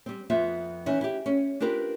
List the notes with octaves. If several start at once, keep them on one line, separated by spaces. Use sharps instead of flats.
G3 C4
F2 B3 F4 C5 E5
E3 C#4 D#4 E4
E4 G4
C#4
D4 F4 G4 A#4 B4